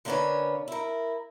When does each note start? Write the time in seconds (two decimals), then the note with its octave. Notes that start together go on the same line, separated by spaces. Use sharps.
0.05 D3 A#3 C#4 D4 B4 C#5
0.68 E4 A#4